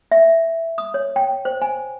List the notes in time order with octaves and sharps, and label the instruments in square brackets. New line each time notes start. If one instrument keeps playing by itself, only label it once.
[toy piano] E5
D#6
C#5
G5
C5
G#5